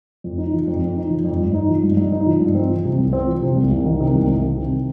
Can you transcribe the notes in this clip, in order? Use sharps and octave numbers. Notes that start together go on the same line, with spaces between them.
F2
D#4
F3
F2
F2
D#4
F3
F2
G2
D#4
F3
G2
G2
D#4
F3
G2
C4
F3
C3
C2
C4
F3
C3
C2
C2
D#3
C3
C2
C2
D#3
C3